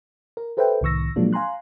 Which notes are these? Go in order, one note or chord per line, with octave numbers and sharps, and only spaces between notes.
A#4
G4 A4 B4 C5 E5 G5
C2 A2 D#3 C#6 E6 A#6
A#2 F3 F#3 G#3 A#3 D4
F5 G#5 A#5 C6 F#6